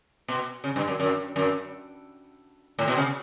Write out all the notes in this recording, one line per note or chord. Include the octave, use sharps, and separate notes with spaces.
B2
C#3
G2
F#2
F#2
F#2
A2
B2
C#3